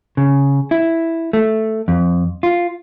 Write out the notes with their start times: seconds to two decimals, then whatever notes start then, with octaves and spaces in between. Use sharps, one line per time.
0.17 C#3
0.71 E4
1.33 A3
1.88 F2
2.43 F4